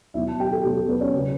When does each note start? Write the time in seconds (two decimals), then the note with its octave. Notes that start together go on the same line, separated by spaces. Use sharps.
0.14 B2 F#3 E4 E5
0.28 A5
0.40 G4 G5
0.51 A4
0.63 B2 F#3 G4
0.77 A4
0.89 B3 B4
1.01 C#4 C#5
1.13 C#3 F#3